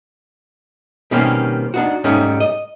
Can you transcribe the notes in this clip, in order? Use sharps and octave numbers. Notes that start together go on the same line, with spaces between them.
B2 D#3 G3 A#3 C4 C#4
D4 D#4 F#4
G#2 G3 A3 C#4 D#4
D#5